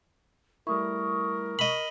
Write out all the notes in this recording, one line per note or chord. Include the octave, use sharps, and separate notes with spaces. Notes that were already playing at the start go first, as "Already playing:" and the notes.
G3 A3 E4 A#4 C#6 D#6
D#5 B5